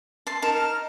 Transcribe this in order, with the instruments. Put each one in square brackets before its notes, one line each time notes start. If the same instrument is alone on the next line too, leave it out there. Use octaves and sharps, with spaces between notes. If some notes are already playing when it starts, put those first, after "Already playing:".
[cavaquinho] A5 C6
[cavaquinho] D#4 A#4 [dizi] A5
[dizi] F6